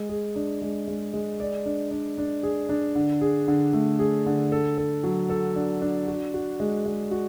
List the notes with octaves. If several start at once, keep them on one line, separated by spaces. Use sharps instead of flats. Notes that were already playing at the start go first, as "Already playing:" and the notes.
Already playing: G#3
G#4
D4
G#3
G#3
G#3
D5
D4
D4
D4
G#4
D4
D3
G#4
D3
A3
G#4
D3
A4
A4
F#3
A4
D4
D4
F#4
F#4
G#3
G#3
F#4